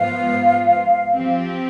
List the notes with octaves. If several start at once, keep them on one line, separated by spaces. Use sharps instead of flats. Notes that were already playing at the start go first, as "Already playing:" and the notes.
Already playing: G#2 F3 B3 F4 C5 F5
F3 C4 G4